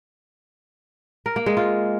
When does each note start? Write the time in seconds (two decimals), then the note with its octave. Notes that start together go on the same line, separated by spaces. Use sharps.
1.26 A#4
1.36 A#3
1.46 G#3
1.57 F4